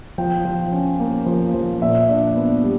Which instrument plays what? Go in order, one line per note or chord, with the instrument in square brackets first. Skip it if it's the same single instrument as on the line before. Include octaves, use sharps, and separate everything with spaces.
[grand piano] F3 G5
F3
C#4
A#3
F3
F3
A#2 E5
D4
B3
G3